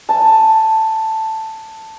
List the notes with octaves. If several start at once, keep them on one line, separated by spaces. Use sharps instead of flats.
G#5 A5